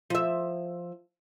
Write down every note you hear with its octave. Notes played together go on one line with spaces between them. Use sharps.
F3 E5